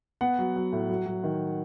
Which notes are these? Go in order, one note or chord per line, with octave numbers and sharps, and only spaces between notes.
B3 F#5
F#3
F#3
A2
F#3
F#3
D#3